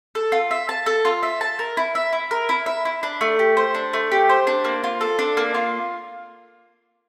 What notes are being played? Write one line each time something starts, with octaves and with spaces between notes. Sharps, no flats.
A4
F4
E5
A5
A4
F4
E5
A5
A#4
E4
E5
E4
A#4
E4
E5
E4
D4
A3
G4
C5
D4
A3
G4
C5
D4
A#3
F4
A4
D4
A#3
F4